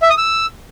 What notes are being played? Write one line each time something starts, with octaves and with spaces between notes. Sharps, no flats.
E5
D#6
E6